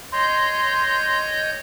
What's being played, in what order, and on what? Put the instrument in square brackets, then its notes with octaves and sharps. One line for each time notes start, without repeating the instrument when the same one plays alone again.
[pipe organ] C#5 D#5 G6 [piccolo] C6